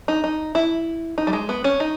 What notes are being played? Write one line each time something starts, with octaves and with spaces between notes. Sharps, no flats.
D#4
D#4
E4
D#4
G3
G#3
B3
C#4
D#4